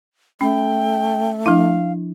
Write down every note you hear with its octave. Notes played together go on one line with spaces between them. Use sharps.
A3 C#4 G5
F3 D4 E4 F5